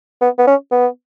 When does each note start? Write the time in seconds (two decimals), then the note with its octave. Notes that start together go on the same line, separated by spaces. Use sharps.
0.21 B3
0.38 B3
0.47 C#4
0.72 B3